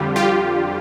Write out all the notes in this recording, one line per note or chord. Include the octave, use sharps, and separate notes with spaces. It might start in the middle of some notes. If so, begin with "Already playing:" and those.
Already playing: F2 D3 G3 F4 G4
F4 G4